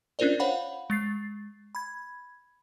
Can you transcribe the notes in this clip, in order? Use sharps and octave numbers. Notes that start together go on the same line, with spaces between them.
C#4 D4 F4 A#4 C5 D5
C5 C#5 F5 F#5 B5
G#3 A6 C7
B5 G#6